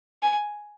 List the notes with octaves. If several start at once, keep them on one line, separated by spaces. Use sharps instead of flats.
G#5